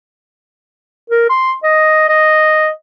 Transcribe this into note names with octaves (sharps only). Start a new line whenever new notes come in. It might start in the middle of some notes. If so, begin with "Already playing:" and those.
A#4
C6
D#5
D#5